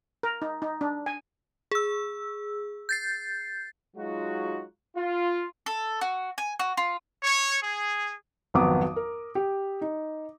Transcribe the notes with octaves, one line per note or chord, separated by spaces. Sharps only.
A#4
D#4
D#4
D4
G#5
G#4 E6
G6 A6 C7
F#3 G#3 D#4 F4 F#4
F4
A4
F#4
G#5
F#4
F4
C#5
G#4
G#1 F2 F#3 B3 D6 D#6
A#4
G4
D#4